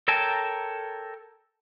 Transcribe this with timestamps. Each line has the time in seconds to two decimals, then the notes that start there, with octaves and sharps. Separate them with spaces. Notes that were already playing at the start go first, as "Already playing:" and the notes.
0.08 A4 A#4 C#5 G5 A5